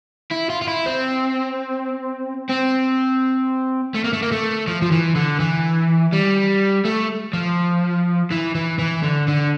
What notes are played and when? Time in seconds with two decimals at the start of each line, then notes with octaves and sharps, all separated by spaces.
0.31 E4
0.50 F4
0.62 F4
0.68 E4
0.86 C4
2.49 C4
3.95 A3
4.04 A#3
4.13 A3
4.23 A#3
4.32 A3
4.67 F3
4.82 F3
4.91 E3
5.16 D3
5.40 E3
6.12 G3
6.85 A3
7.33 F3
8.31 E3
8.55 E3
8.79 E3
9.03 D3
9.28 D3